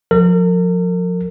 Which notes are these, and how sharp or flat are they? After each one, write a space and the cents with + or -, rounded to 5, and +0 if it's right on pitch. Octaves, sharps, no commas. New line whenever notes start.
F3 +30 A#4 -40